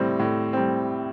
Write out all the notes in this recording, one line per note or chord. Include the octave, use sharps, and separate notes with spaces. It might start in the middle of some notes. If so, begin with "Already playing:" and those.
Already playing: A2 G3 C4
A2
G3 C4